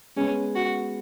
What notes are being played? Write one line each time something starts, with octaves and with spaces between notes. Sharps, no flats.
G#3 B3 C#4 G#4
F#4